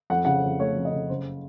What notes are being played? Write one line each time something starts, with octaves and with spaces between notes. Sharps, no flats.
F2 F#5
C#3 F#5
F2
A3 C#5
F2
D#5
C#3
F#1 C5